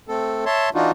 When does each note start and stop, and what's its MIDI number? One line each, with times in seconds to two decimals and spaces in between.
0.08 0.45 57
0.08 0.45 60
0.08 0.45 69
0.45 0.70 73
0.45 0.70 76
0.45 0.70 81
0.45 0.70 84
0.74 0.91 52
0.74 0.91 62
0.74 0.91 63
0.74 0.91 65
0.74 0.91 66